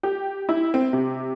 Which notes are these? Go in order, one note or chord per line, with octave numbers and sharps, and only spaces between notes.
G4
E4
C4
C3